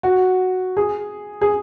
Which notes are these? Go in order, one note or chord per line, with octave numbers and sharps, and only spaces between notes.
F#4
G#4
G#4